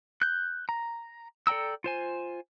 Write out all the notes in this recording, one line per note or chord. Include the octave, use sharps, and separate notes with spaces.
F#6 G6
A#5
A4 D5 G5 A#5 E6
F4 C5 G#5